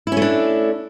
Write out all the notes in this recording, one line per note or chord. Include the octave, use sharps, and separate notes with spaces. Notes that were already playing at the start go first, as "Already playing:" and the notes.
A3 C#4 D4 E4